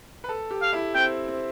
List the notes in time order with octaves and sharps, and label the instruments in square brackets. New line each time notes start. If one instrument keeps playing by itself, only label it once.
[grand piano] B4
A4
G4
[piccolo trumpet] F5
[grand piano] E4
[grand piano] C4 [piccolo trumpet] G5
[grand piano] C4